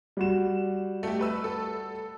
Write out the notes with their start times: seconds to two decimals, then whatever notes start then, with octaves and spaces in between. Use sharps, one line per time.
0.17 G3 F#4 E7
1.03 A3 G4
1.19 A3 B4 E6
1.44 A4